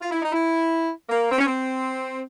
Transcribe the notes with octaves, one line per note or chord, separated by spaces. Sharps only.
F4
E4
D#4
E4
A#3
C4
C#4
C4